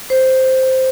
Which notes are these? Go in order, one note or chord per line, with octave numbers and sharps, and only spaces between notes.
C5